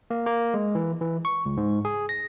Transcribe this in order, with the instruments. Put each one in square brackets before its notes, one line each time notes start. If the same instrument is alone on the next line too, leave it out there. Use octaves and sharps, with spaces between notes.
[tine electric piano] A#3
A#3
G#3
E3
E3
C#6
C#2
G#2
G#4
A#6